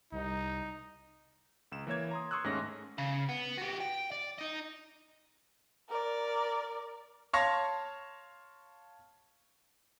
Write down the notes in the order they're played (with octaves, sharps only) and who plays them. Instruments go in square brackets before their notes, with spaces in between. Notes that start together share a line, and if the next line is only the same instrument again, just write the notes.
[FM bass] C2 [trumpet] D#4
[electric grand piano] C#2 E7
E3 A#3 C#5 G#6
A#5 C6 D#6
C6 C#6 D#6 E6 F#6
D#2 G#2 A3 C#4 C#5 A#6
[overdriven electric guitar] C#3
B3
F#4 G4
G5
D5
D#4 D#5
[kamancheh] A#4 D5
[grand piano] C#5 F5 A5 C6 C#6 A#6